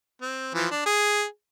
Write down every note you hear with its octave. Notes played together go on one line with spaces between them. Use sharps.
C4
E3 F3
D4
G#4